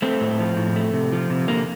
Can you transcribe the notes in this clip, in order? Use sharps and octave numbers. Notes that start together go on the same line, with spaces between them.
A3 C4
A2
F3
A2
A3
C3
F3
C3
D3 A#3